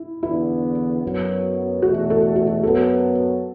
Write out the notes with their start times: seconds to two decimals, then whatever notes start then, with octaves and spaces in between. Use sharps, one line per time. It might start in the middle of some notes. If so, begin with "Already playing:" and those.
Already playing: E4
0.22 E2 D3 B3 D4 E4
1.02 F#2 F#3 B3
1.82 E2 B2 A3 F#4
2.10 A4
2.36 F#4
2.63 F#2 F#3 B3 A4